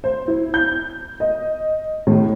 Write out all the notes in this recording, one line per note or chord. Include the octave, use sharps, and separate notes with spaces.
C5
E4
G6
D#5
A2